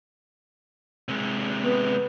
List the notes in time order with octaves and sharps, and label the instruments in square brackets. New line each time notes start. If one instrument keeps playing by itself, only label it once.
[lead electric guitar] C3 G#3
[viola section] B3